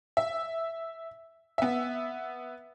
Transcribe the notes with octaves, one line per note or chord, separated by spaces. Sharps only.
E5
B3 E5